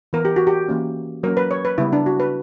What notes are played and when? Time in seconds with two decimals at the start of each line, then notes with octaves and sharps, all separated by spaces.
0.13 E3 B3 A#4
0.25 G4
0.36 F#4
0.47 G4
0.68 E3 A#3 C#4
1.23 F#3 A#3 C#4 A#4
1.37 B4
1.51 C#5
1.65 B4
1.78 C#3 G3 B3 E4
1.93 D4
2.06 F#4
2.20 B4